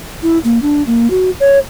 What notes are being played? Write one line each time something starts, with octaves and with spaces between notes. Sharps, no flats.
E4
A#3
D4
A#3
F#4
C#5